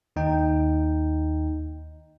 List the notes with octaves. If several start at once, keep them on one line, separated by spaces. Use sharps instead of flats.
D#2 D#4 G5